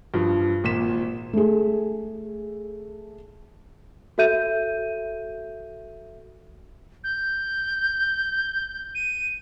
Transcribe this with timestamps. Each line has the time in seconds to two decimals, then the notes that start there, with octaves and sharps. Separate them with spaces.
0.14 G2 F3
0.64 G#1 A#2 B6 E7
1.33 A3 G#4
4.18 F#4 A4 E5 G6 D#7
7.04 G6
8.95 D#7